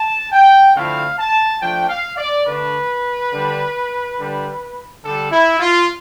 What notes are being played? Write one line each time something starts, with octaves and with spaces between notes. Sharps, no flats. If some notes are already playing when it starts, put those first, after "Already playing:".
Already playing: A5
G5
D3 F3 A3 C4 E4 F5
A5
F3 A3 D4 G5
F5
D5
D3 A3 D4 B4
D3 G3 D4
D3 G3 D4
D3 G3 D4 A4
E4
F4